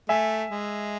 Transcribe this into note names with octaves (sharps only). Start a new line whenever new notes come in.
A3 E5 G#5
G#3